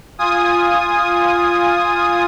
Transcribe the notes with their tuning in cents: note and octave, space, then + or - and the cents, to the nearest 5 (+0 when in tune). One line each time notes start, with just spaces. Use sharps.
F4 +0 G#5 -10 D#6 +0